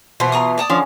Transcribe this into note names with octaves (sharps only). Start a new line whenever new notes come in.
B2 E3 F4 C5
A#5 C#6 D#6
D5 A5 D#6
D3 F3 C#4